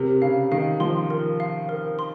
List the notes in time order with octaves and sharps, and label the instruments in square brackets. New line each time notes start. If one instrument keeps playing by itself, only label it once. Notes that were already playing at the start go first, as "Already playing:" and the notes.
Already playing: [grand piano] C3 [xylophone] A#4
[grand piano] C#3 [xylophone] F5
[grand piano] D#3 [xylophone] F5
[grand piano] F3 [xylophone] C6
[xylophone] A#4
F5
A#4
C6